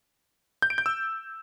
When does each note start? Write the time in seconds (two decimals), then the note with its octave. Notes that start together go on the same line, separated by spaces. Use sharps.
0.62 G6
0.70 D7
0.78 G6
0.86 E6